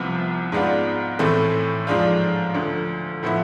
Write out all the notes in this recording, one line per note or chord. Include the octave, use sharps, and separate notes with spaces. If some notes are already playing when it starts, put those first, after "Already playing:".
Already playing: C2 C3 F3 B3 F4
G#2 G#3 B3 D4 F4
A2 E3 A3 C4
G#2 F3 G#3 D4 F4
D2 D3 F3
A2 F3 B3 E4